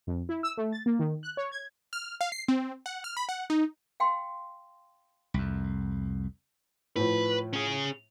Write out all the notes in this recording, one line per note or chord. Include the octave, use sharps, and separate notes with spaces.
F2
E4
E6
A3
A6
A#3
D#3
F#6
C#5
G#6
F6
F5
C7
C4
F#5
F6
B5
F#5
D#4
F5 G5 C6
C2 F2
A2 F3 B4
C#4 G#4